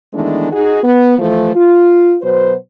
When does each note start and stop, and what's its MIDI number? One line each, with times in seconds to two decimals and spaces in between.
0.13 0.51 51
0.13 0.51 52
0.13 0.51 56
0.13 0.51 57
0.13 0.51 59
0.13 0.51 62
0.51 0.81 63
0.51 0.81 66
0.51 0.81 68
0.83 1.16 59
1.18 1.52 52
1.18 1.52 53
1.18 1.52 57
1.55 2.15 65
2.22 2.54 47
2.22 2.54 54
2.22 2.54 71
2.22 2.54 72